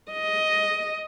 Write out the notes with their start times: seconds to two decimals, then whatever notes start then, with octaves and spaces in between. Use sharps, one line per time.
0.12 D#5